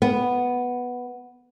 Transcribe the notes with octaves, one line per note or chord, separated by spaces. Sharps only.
B3